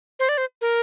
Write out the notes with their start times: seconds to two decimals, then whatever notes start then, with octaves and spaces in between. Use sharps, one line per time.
0.20 C5
0.29 D5
0.38 C5
0.61 A#4